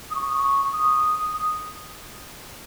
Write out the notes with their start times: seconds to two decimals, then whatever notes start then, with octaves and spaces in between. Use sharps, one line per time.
0.11 D#6
0.15 C#6
0.25 D#6
0.35 C#6
0.73 D#6